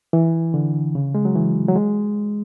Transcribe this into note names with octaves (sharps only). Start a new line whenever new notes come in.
E3
D3
C#3
G#3
F#3
E3
F#3
G#3